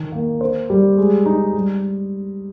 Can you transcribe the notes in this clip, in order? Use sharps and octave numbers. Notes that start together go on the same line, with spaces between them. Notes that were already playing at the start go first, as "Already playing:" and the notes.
Already playing: D#3 D#4
A#3
C5
G3
G#3
D#4
G3